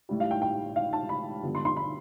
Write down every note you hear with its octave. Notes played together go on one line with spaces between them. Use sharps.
A1 A2 E3 G3
F5
G5
G5
F5
A5
B5
G2 D3 F3 B3
C6
C6
B5